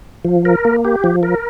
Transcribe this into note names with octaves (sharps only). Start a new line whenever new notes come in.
F3
A#4
A#3
G4
F3
A#4